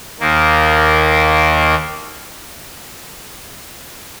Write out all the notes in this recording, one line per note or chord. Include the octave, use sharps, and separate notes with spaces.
D#2 D#3 A#3